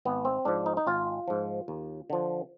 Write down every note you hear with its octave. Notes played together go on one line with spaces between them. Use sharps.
G#1 B3
C4
G#2 F3 D4
D#4
D#4
G#1 F4
G#2 F3
D#2
D3 F3